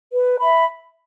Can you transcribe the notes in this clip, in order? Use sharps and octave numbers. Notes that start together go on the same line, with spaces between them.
B4
E5 B5